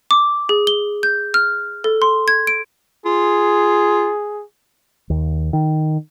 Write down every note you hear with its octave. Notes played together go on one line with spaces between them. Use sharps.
D6
G#4
G7
G6
F6
A4
C6
G#6
D7
F4 G#4
D#2
D#3